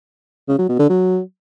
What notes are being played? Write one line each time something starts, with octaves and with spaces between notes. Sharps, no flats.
C#3
F#3
B2
D3
F#3